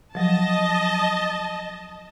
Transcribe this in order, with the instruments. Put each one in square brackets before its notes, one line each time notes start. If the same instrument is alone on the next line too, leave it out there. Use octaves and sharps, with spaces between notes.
[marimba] F3 F#3 [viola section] D#5 A5